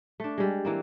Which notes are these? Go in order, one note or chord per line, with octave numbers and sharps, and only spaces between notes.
A3 D4
G3 G#3
E3 A#3 C4